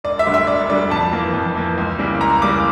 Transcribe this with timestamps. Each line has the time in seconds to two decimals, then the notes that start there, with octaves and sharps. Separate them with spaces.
0.04 E1 D5
0.19 E5
0.26 D2 D3 G3
0.34 E5
0.47 E1 D5
0.69 D2 D3 G3 D5
0.90 F2 A5
1.13 E3 A#3
1.34 F2
1.56 E3 A#3
1.78 C#2
1.99 C#3 G3 A#3 E4
2.21 C#2 A#5
2.42 C#3 G3 A#3 E4 D6